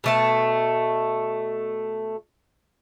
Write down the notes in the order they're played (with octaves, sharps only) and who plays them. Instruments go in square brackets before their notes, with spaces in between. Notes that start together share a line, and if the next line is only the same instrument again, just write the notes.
[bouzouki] B2 A3 A5